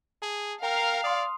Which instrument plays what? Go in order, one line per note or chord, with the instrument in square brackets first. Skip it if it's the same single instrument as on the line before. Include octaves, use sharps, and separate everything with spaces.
[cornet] G#4 [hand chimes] A5
[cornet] A#4 [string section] F5 [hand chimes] G5 A#5
[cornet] D5 [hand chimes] C6 D#6